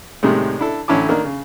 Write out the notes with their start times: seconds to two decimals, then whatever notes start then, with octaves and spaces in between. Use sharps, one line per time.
0.23 A2 C3 D#3 G3 G#3
0.59 D4 E4 A4
0.88 A1 D3 C#4 E4 A5 D6
1.09 D#3 A#3 D4
1.24 C#3